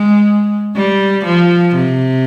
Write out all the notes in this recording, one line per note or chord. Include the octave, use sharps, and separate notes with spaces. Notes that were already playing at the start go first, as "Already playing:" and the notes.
Already playing: G#3
G3
F3
C3